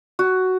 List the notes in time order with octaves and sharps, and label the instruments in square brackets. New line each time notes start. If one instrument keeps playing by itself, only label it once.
[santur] F#4